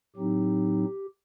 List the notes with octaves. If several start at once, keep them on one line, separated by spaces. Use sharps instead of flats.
A2 F#3 C4 D#4 G4